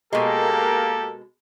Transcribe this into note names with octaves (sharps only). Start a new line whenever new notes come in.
B2 G#3 A#3 G4 A4